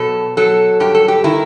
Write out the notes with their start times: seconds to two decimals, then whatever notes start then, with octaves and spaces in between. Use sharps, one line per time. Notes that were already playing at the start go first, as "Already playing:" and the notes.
Already playing: B2 F#3 A4
0.37 F#3 A4
0.80 G2 G4
0.95 A4
1.08 G4
1.24 D#3 E4